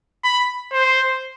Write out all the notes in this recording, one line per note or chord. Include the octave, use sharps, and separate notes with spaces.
B5
C5